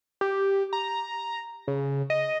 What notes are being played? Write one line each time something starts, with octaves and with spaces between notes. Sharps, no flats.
G4
A#5
C#3
D#5